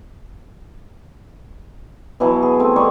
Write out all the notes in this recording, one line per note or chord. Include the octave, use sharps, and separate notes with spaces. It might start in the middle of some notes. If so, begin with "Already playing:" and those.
B2 E3 F#3 B3
G#4
A3 C4
G3 D#5 F#5 C#6